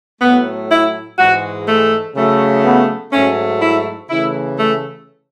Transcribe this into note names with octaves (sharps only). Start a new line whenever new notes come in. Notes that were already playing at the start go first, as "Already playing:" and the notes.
A2 F#3 A3 B3
E4
G#2 E3 G#3 F#4
A3
C#3 F#3 A3
B3
G#2 F#3 A3 C#4
E4
C#3 E3 A3 E4
A3